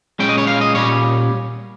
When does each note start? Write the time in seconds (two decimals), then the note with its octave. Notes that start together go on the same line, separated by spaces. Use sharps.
0.19 A#2 G#3 C#4 G5
0.29 D#5
0.38 C#5
0.47 F5
0.61 D#5
0.75 A#2 G3 C#4 C#5